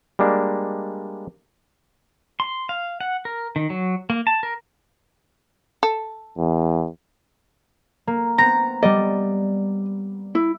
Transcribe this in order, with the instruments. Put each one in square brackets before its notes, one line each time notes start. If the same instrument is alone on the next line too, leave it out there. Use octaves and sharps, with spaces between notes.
[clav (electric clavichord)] G3 G#3 A#3 D4
[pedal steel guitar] C6
F5
F#5
A#4
D#3
F#3
A#3
A5
A#4
[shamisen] A4
[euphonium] E2
[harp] A#3
[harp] B3 C4 [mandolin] A#5
[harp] G3 B3 D5 [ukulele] D#5
[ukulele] E4